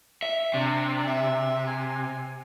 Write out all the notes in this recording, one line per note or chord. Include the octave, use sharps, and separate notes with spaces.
E5
C3 D4
E5
G#5